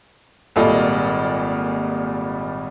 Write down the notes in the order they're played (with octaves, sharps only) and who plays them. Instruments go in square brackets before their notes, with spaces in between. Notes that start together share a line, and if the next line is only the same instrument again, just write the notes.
[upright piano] G#1 A#2 G3 F4 A4 D#5